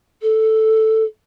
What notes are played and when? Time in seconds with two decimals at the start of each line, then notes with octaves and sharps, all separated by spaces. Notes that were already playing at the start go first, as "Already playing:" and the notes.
0.22 A4